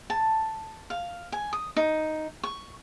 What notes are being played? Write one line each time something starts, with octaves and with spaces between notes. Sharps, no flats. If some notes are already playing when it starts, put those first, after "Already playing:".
A5
F5
G#5
D#6
D#4
C#6